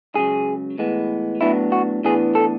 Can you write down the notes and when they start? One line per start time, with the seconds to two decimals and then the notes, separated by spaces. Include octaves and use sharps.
0.15 C#2 C#3 F#3 G#4
0.78 A2 E3 G#3 B3
1.41 A2 F#3 B3 D4 E4
1.72 F#4
2.03 A2 E3 B3 D4 G#4
2.35 A4